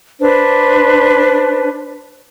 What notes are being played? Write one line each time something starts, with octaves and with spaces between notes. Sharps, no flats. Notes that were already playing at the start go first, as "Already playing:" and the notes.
D4 B4 C5